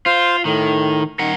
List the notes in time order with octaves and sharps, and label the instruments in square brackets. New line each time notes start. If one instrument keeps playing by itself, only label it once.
[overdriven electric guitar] F4 [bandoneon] C5 F5
[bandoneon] A2 [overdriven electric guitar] D#3
[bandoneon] D#3 [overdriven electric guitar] A#4 F#5